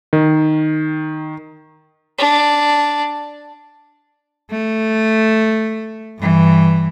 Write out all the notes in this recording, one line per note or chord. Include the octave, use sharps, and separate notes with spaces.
D#3
D4
A3
G2 E3